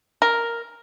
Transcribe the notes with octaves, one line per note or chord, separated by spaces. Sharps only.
A#4